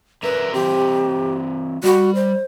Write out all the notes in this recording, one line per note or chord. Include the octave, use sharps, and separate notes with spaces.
D3 A#4 B4 E5
E3 C4 G4
G3 F#4
C5